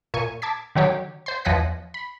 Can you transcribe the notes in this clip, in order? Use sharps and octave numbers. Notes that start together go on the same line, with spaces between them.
A#2 G#5 C#6
A5 D6 G#6 B6
D3 D#3 F#3 F#4 G4 C#5
C5 C6
E2 F3 C#5 D#5 F#6 B6
B5